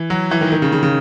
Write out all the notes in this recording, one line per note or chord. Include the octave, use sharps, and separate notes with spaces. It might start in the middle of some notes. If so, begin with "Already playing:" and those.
Already playing: E3
F#3
E3
D#3
D#3
C#3
C#3
C#3